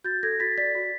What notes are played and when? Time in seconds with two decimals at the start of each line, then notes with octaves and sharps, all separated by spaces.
0.04 F#4 G6 A6
0.23 A4 G#6 A#6
0.40 F#4 A6 B6
0.58 D5 A6 B6
0.75 F#4